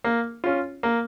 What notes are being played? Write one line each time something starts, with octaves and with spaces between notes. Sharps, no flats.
A#3
C#4 F4
A#3